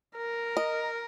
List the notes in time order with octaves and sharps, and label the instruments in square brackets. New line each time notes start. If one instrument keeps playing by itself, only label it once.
[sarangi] A#4
[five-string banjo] D#5